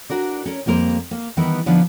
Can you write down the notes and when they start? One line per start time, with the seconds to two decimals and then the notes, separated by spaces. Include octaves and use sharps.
0.10 D4 F#4 A#4 D5
0.46 C#4 A#4
0.66 F2 G3 A#3 A#4 C5
1.11 A#3
1.37 D#3 E3 G3 B3 E4 A#4
1.66 D3 F3 B3 D4 D#4